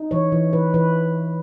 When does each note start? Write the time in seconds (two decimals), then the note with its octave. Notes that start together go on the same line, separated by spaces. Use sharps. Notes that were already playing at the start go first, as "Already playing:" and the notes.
Already playing: D#4
0.11 E3 C#5
0.32 E3
0.53 E3 B4
0.74 E3 B4